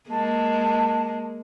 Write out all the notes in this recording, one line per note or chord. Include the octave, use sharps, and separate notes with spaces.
G#3 A#3 A5